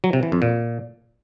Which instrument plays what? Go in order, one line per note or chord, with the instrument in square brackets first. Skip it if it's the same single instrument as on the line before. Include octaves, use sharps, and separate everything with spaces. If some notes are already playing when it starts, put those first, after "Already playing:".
[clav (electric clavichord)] F#3
C3
E3
F2
A#2